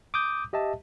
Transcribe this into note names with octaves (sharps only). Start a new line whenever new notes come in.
D6 D#6 G6
G4 D#5 E5 A5